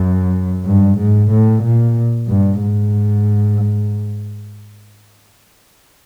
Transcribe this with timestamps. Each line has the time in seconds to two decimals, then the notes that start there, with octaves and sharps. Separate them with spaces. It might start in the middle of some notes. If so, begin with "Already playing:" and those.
Already playing: F#2
0.65 G2
0.97 G#2
1.30 A2
1.62 A#2
2.27 G2
2.60 G#2